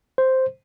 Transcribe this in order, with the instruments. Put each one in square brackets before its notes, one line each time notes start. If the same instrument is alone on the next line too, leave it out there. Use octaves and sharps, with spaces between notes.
[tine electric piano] C5